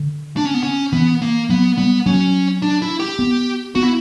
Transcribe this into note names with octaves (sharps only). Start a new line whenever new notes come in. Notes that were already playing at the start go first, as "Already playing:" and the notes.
Already playing: D3
D4
C#4
B3
C#4
E3 B3
A#3
F#3 B3
G3 B3
F#3 C#4
D4
E4
G4
B3
B3 F#4
E4